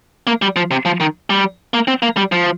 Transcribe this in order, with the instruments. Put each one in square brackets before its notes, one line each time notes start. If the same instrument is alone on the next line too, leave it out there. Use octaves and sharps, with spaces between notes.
[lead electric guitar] A#3
G3
F3
C3
F3
D#3
G3
A#3
C4
A#3
G3
F3